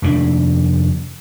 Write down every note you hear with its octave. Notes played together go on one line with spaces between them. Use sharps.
F1 D#2 C3 D4